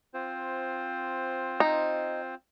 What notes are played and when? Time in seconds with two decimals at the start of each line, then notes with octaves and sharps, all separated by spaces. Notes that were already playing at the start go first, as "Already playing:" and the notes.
0.14 C4 F4 C5
1.60 D#4